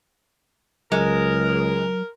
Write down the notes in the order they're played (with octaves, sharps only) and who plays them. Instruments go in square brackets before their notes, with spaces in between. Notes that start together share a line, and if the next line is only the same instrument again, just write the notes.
[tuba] C#2 [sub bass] F#3 [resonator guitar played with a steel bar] G#3 [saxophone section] A#4